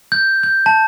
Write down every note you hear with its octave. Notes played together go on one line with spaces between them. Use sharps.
G6
G6
A5